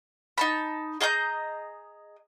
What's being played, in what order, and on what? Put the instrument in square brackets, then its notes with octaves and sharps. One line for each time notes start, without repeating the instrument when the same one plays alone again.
[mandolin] D#4 A5 B5
G#4 D#5 A#5 G6